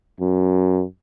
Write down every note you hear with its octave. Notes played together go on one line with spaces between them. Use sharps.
F#2